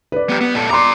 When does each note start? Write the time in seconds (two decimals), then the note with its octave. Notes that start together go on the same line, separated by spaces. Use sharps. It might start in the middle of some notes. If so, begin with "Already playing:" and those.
0.12 B4 D5
0.30 B3 G4
0.41 B3
0.55 A#2 A4
0.70 D5 A#5 C6 D6